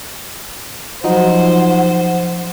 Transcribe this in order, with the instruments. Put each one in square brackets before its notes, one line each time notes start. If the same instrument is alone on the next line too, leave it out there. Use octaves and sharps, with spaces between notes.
[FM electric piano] F3 F#3 D#4 [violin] C5 [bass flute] F#5